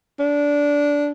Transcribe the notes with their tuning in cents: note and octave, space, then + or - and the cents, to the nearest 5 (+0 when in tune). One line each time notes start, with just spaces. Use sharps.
D4 -15